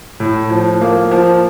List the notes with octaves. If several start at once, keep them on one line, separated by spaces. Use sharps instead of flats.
A2
F3
A#3
F3